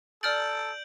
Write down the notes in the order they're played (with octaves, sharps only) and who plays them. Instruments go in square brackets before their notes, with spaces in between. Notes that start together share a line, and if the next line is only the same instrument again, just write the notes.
[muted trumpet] A4 [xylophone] D5 F6 A6 [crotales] G6 D7 F#7